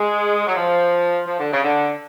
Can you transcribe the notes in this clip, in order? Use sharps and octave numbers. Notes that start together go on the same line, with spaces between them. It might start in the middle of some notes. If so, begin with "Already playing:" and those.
Already playing: G#3
F#3
F3
F3
D3
C#3
D3